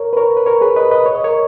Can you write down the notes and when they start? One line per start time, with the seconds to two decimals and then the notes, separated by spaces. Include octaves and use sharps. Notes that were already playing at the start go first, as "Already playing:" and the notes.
Already playing: A#4 C#5
0.13 B4
0.17 A#4 C#5
0.37 B4
0.46 A#4 C#5
0.61 G#4 B4
0.76 B4 D#5
0.91 B4 D#5
1.06 C#5
1.15 D#5
1.24 A#4 C#5